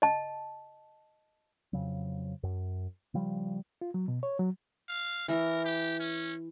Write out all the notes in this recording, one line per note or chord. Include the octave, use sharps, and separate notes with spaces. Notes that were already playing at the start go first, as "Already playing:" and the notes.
D#5 A5
F2 C#3 F#3
F#2
C#3 F3 G3
F4
F#3
B2
C#5
F#3
F5
E3 A#4 E5
G4
C#4